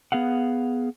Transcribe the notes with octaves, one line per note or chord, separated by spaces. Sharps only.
B3 G#4 F5 F#5